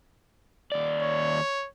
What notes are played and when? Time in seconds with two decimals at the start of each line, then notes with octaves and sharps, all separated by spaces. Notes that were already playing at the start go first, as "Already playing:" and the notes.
0.72 D#2 D5
1.02 C#5